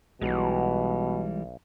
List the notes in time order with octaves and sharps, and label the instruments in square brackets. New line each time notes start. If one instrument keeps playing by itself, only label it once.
[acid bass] B1 [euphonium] B2 [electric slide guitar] E3 G3 G#3